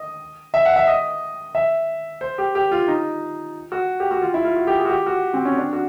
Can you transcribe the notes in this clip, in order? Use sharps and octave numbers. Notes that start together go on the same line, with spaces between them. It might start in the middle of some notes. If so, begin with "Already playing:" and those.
Already playing: D#5
E5
F#5
E5
D#5
E5
C5
G4
G4
F4
D#4
F#4
G4
F#4
F4
E4
F4
F#4
G4
G#4
F#4
G4
F#4
C4
C#4
D4
F#4